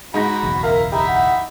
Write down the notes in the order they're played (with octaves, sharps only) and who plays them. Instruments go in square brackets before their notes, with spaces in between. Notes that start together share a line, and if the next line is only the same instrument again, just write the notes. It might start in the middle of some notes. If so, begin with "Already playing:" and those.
[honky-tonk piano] G#2 D#4 A#6 [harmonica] F#4 B5
[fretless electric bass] F#1 B1 E2
[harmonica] E4 A#5 [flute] A#4 [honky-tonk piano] F5
[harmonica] D#4 E5 B5 [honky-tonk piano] G4 [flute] A#5
[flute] F#5